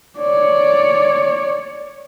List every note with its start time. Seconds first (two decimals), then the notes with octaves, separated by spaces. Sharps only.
0.18 C#5 D5